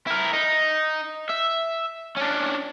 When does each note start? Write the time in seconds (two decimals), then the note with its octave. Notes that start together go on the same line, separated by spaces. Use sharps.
0.07 E4 A#4
0.33 D#4
1.30 E5
2.17 C#4 D4